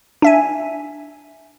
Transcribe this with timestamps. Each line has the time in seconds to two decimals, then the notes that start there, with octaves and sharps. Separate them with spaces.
0.22 D4 E5 G#5